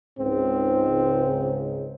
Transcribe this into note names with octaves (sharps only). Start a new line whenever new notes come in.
C#2 G#2 C4